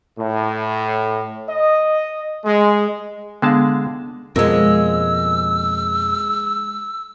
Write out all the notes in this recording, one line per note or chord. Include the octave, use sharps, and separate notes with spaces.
A2
D#5
G#3
D3 G#3 B3 F5 A5
F2 B2 F3 G#3 A#3 E6